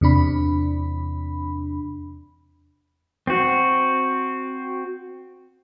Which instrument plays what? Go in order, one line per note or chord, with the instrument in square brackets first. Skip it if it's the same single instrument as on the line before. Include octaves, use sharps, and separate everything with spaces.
[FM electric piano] E2 C3 D4 B5
[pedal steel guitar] C4 F#4